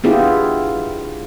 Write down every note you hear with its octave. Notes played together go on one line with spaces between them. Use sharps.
B3 D4 E4 F4 G4 G#4